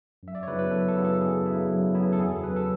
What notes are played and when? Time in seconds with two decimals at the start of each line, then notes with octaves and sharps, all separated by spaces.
0.23 F#2 E5
0.35 D5
0.43 C#5
0.47 C#3 F#3 B3 E4 B4
0.59 B4
0.71 F#2 A4
0.88 A4
0.96 C#3 F#3 B3 E4
1.05 A4
1.21 F#2 G#4
1.46 C#3 F#3 B3 E4
1.70 F#2
1.95 C#3 F#3 B3 E4
2.13 A4
2.19 E2 G#4
2.31 A4
2.43 C#3 F#3 B4
2.56 A4